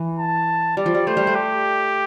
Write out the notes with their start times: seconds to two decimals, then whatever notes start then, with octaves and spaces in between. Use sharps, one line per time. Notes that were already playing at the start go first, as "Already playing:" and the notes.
Already playing: E3
0.19 A5
0.77 G3 D5
0.86 F3
0.95 G3
1.07 A3 C5
1.17 G3
1.27 A3
1.35 G4